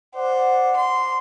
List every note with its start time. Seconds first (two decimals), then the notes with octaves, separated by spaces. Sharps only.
0.16 C5 D5 F#5
0.76 C6